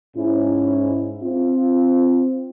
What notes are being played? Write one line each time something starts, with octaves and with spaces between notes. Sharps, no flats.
G#2 C#4 E4
C4 F4